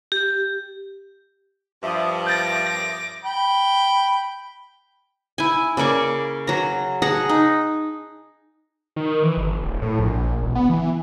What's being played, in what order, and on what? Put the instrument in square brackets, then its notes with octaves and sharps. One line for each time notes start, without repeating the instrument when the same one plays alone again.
[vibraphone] G4
[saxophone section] G2 F3 [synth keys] E5 D#6
[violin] D6 A#6 [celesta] G6 A6
[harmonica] G5 B5
[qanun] E4 G#5
C#3 A#3 D5 C#6
F#3 A#5
G#4 F#5 A5 A#5
D#4
[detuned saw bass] D#3
E3
G1
D1
A2
A#1
E1
B3
E3